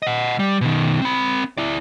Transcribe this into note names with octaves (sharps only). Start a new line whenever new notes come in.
D#5 F#5
G3
B2 D#3
C4 B5
E4 D5